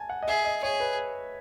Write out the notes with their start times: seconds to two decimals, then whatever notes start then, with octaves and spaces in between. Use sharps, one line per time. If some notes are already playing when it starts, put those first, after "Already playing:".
Already playing: G#5 A5
0.09 F#5
0.22 D#5
0.28 G#4 E5
0.45 D#5
0.63 G#4 C#5
0.80 B4